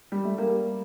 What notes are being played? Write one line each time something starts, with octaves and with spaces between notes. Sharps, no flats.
G3
A3
G3 A#3